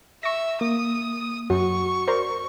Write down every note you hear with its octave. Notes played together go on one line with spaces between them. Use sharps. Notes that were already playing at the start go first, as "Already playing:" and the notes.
E5 C#6 A#6
A#3 D#6
F#2 F#4 C#6
A#4 C5 D5